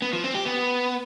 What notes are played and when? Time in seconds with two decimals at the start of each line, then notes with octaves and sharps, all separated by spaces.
0.02 B3
0.13 F3
0.24 C4
0.35 G4
0.46 B3